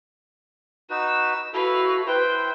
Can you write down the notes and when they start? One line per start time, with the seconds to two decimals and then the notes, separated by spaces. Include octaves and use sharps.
0.90 D#4 F#4 B4 E6
1.53 E4 F#4 A4 B4 F5
2.07 E4 B4 C5 G5